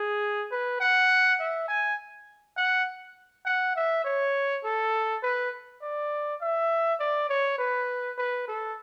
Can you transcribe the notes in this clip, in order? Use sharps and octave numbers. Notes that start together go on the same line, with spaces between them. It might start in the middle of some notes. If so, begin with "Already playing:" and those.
Already playing: G#4
B4
F#5
E5
G#5
F#5
F#5
E5
C#5
A4
B4
D5
E5
D5
C#5
B4
B4
A4